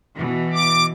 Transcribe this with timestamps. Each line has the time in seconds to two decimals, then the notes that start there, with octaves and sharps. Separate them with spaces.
0.16 B2 E3
0.53 D6